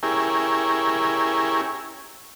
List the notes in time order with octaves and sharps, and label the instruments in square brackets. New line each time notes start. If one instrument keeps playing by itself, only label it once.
[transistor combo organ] C#4 E4 G4 G#4 A#4